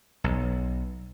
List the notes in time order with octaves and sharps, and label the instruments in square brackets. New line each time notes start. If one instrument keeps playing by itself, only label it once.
[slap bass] B1